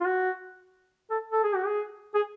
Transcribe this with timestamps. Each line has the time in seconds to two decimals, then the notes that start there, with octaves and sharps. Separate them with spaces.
0.01 F4
0.05 F#4
1.10 A4
1.32 A4
1.43 G#4
1.55 F#4
1.66 G#4
2.15 G#4